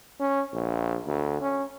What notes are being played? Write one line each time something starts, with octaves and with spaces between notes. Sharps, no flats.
C#4
A#1
D2
C#4